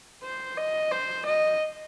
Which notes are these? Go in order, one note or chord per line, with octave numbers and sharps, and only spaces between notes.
C5
D#5
C5
D#5